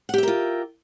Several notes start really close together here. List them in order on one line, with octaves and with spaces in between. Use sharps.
F#5 G4 E5 A#4 F4